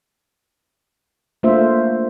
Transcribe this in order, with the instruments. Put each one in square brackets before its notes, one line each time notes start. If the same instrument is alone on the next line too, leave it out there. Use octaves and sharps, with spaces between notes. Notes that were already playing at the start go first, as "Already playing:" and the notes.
[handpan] A3 A#3 D4 F4 C5 E5